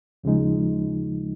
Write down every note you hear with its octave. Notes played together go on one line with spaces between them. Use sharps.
D#2 C#3 F3 G#3 D#4